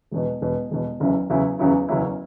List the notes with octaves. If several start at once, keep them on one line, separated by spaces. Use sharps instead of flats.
E1 E2 B2
E1 E2 B2
E1 E2 B2
F#1 E2 C#3 F#3 E4
F#1 E2 C#3 F#3 E4
F#1 E2 C#3 F#3 E4
F#1 E2 C#3 F#3 E4